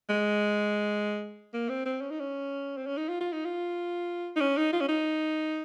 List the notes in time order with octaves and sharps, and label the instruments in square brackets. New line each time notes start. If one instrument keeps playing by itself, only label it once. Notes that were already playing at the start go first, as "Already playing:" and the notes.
[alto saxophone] G#3
A#3
C4
C4
C#4
D#4
C#4
C4
C#4
D#4
F4
F4
D#4
F4
D#4
C#4
D#4
F4
C#4
D#4